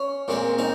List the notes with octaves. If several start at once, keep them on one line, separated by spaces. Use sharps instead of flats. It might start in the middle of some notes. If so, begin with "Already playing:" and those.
Already playing: C#4
A#2 G#3 C4
C4 D#4